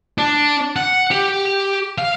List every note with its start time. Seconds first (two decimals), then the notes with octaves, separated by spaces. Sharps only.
0.18 D4
0.76 F#5
1.11 G4
1.98 F5